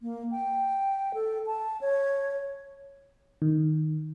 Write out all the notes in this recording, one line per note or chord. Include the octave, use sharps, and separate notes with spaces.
A#3
G5
A4
A5
C#5
D#3